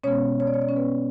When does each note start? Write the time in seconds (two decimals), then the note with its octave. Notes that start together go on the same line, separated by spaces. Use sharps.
0.04 B2 G#3 B3 C#4 C#5
0.40 C#5
0.47 D5
0.54 C#5
0.62 D5
0.69 C#4 C#5
0.76 B3 B4